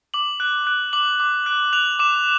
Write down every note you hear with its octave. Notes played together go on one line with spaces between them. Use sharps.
D6 F#7
F#6
F#6
D6 F#7
D6
F#6
F#6 F7
D6 E7